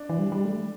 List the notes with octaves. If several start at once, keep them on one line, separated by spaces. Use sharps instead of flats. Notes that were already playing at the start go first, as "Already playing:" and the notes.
Already playing: D4
E3
G3
G3
A3